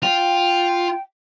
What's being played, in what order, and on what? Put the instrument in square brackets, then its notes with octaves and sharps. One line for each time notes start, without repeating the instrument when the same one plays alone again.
[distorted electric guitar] F4 [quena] G5